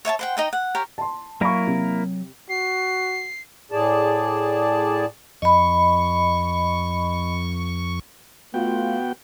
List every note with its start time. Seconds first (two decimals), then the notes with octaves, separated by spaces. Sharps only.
0.05 C#5 E5 G#5 A5
0.19 C5 F#5 G5
0.37 D#4 D#5 G5
0.53 F#5
0.75 G4 A#4 C#5
0.98 A5 C6
1.41 F#3 A#3 E4 A#4 F5 B5 C#6
1.67 C3
2.49 F#4 C7
3.72 A2 G#4 D5 A5
5.42 F2 D#5 B5 C#6
8.54 A3 B3 F4 F#4 G5